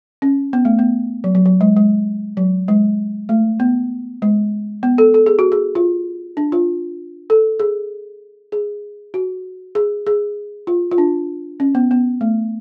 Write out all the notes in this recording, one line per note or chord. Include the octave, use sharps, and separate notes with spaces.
C#4
B3
A3
B3
F#3
F#3
F#3
G#3
G#3
F#3
G#3
A3
B3
G#3
B3
A4
A4
G#4
F#4
G#4
F4
D4
F4
A4
G#4
G#4
F#4
G#4
G#4
F4
F4
D4
C#4
B3
B3
A3